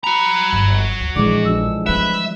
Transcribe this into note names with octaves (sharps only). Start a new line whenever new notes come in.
F#4 A#5 B5
G1
D2
A#1 D3 E3 G#3 D5
F3 D4 E6
G3 C4 B4 E5